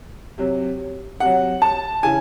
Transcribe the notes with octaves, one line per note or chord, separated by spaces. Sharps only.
C3 F#3
C3 F#3 F#5
A5
C#3 E3 G#5